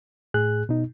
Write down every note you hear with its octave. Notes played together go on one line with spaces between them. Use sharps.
A2 G#4 F#6
B2 D#4